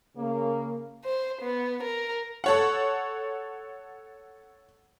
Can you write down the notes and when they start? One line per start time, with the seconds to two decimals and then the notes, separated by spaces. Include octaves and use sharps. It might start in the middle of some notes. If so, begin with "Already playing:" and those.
0.17 C#3 A#3
1.05 C5
1.42 B3
1.83 A#4
2.44 A4 C#5 F#5